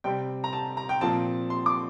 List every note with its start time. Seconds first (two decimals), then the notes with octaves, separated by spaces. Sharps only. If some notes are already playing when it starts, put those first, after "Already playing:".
0.04 C3 G3 C4 G5
0.44 A#5
0.53 A5
0.77 A#5
0.89 G5
1.01 A#2 F3 C4 A5
1.50 C6
1.66 D6